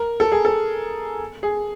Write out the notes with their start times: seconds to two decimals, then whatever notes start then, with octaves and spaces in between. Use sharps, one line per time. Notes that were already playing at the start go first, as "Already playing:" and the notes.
Already playing: A#4
0.20 A4
0.32 G#4
0.45 A4
1.43 G#4